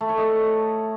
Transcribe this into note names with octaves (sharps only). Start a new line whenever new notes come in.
A3
C#5
D#5